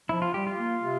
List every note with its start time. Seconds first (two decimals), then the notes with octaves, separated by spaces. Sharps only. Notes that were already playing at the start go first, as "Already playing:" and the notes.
0.09 F3 E4
0.22 F4
0.34 G3 G4
0.47 F4
0.59 A#3
0.83 C3